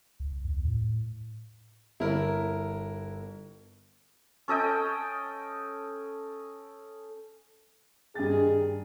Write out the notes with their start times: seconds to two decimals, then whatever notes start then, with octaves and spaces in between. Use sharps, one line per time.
0.20 C#2
0.45 E2
0.65 A2
2.00 G1 E4 A#4
4.48 C#4 A4 D#5 G5
8.15 G2 D#3 G#4 G5 A6